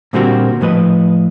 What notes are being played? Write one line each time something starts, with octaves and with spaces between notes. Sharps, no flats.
A#2 D3 G3 A#3 C4 F#4
A2 F3 B4 D#5